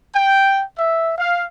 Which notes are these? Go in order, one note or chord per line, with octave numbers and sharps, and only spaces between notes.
G5
E5
F5